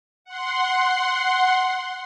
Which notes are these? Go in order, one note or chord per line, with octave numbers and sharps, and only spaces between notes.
F#5 C6